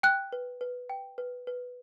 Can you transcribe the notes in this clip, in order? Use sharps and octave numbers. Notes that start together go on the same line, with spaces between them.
G5 F#6
B4
B4
G5
B4
B4